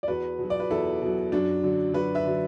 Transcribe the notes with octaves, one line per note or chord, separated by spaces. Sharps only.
D5
E2 F#4 B4
B2 F#3
D5
B4
E2 E4 A4
B2 F#3
F#2 D4 F#4
D3 F#3
F#2 F#4 B4
B4 E5
D3 F#3